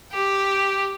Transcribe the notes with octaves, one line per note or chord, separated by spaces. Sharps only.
G4